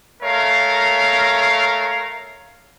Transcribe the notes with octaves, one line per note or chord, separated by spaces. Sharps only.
A3 A#4 C#5 F5